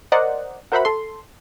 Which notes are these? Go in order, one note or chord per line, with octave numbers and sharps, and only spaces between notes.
A#4 C5 D5 D#5 F#5
F#4 A#4 C5 E5 F#5 B5
A4 C6